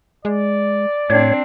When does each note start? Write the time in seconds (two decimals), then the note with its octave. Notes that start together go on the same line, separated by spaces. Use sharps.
0.25 G#3 D5
1.10 A2 C4 D4 C#5